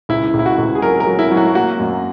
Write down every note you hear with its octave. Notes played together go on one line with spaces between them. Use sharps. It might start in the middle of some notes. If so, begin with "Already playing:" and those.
C#2 E4
C#2
E4
F#4
C#2
G#4
F#3 A#4
A#4
F#3
E4
F#3
F#4
A#3 F#4
F#2